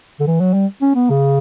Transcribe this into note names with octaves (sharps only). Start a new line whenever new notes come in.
D3
E3
F#3
G3
C#4
B3
C#3